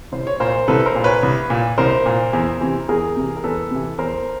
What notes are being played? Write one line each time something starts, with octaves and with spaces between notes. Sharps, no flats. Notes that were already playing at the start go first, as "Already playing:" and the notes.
C2 C5
C#5
A#2 A#4 C5
C2 A4 B4
A#4 C5
A#2
B4 C#5
C2
A#2
C2 A#4 C5
A#2
E2
C3 E3
E2 G#4 A#4
C3 E3
A#4
E2 A4 B4
C3 E3
E2 A#4 C5